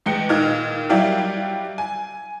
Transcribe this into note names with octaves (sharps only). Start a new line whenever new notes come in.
E2 G#3 G5 C#7
A#2 D#3 D#5 F6 G#6
F#3 G3 E4 G4 D5 F5
G#5